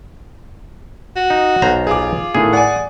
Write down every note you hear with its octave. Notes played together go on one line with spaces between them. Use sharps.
F#4
D#4
B1 C5 A#5
F4 G#4 D6
A2 D#3 A3 G#4
D5 F#5 G#5